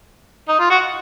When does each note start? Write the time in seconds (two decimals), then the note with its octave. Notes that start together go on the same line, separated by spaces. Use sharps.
0.48 D#4
0.59 F4
0.70 F#4